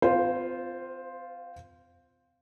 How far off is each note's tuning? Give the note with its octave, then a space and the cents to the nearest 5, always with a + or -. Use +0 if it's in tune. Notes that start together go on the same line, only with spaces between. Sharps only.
C4 -40 F4 +0 C5 +0